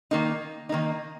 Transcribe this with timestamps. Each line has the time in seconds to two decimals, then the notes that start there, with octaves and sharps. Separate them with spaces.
0.11 D#3 A#3 D#4
0.69 D#3 A#3 D#4